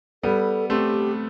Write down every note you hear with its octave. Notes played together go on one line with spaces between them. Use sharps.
G3 B3 A4
A3 C4 G4